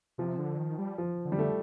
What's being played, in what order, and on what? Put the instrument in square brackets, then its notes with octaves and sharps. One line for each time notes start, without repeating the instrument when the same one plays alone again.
[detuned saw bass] C3 [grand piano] F3
[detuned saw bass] D3
D#3
G3
[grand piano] F3
[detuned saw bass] D3
[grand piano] G3
A3